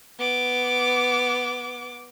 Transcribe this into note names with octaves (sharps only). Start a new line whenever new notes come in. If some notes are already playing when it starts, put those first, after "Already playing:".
B3 D6